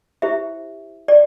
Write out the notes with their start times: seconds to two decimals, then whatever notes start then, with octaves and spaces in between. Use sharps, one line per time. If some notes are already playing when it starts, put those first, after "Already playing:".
0.22 E4 G4 C5 E5
1.08 D5